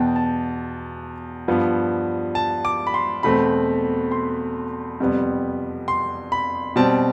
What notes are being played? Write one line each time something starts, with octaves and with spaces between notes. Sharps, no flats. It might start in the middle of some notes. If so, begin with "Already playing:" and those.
Already playing: E2 B2 B3 G5 A5
A5
G2 F3 B3
A5
D6
B5
C6
E2 B2 A3 C4 B5
C6
F2 C3 G3 B3
C6
B5
B2 G3 C4 A5